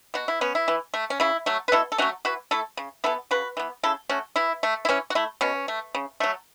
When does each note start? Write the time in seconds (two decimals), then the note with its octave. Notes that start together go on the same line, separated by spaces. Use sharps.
0.14 B2 F#4
0.28 E4
0.41 B3 C#4
0.55 E4
0.68 E3
0.94 A3
1.10 C#4
1.20 C#3 E4
1.46 F#3 A3
1.68 B4
1.72 B2 E4 A4
1.92 A4
1.98 F#3 A3 C#4 F#4
2.25 E3 F#4 B4
2.51 A3 E4 A4
2.77 C#3
3.04 E3 B3 E4 A4
3.31 C#3 F#4 B4
3.57 E3 B3
3.83 C#3 E4 A4
4.10 A3 C#4 F#4
4.36 E3 E4
4.63 A3
4.85 E4
4.89 E3 C#4
5.10 F#4
5.15 A3 E4
5.41 B2 C#4
5.68 A3
5.95 C#3
6.20 F#3 A3